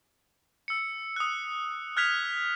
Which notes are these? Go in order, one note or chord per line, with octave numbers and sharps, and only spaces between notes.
E6 C#7
D#6 F#6
F6 F#6 G#6 B6 F7